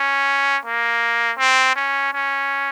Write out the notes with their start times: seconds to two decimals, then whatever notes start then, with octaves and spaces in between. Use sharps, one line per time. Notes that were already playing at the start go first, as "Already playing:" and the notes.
Already playing: C#4
0.65 A#3
1.38 C4
1.76 C#4
2.13 C#4